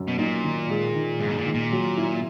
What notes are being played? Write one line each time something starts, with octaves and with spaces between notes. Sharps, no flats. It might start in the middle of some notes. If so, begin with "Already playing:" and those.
Already playing: F#2
B2
A#2 D#4
D#3
G#3
D#3
G#2 G#3
B2
A#2
D#3
A#2
F#3
E4